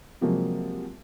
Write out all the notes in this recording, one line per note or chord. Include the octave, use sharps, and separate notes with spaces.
C3 F3 F#3 G#3 A#3 C4